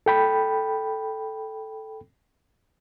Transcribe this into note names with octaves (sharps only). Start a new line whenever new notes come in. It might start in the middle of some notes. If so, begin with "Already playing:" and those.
A4 G5 B5